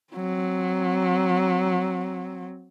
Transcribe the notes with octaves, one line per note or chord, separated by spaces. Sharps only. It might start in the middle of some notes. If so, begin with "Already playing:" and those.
F#3 C4